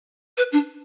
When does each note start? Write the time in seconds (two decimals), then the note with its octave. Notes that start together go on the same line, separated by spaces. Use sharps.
0.37 B4
0.52 D4